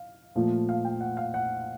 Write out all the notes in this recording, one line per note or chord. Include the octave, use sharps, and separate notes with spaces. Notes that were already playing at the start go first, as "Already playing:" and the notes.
Already playing: F5
A#2 F3 A3
F5
G5
F#5
F5
F#5